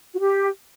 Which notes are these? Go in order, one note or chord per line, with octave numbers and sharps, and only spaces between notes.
F#4
G4